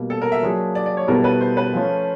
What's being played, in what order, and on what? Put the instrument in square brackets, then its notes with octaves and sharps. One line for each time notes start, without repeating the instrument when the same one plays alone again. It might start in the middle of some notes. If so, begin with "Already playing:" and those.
Already playing: [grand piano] B2 G3 A#3
[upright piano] A4
A#4
E5
[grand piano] F#3 A#3 D4 F4 G#4
[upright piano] D5
D5
C#5
[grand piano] B2 G3 B3 E4 A4 [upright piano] A#4
[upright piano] B4
C5
B4
[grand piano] F3 A3 C#4 F4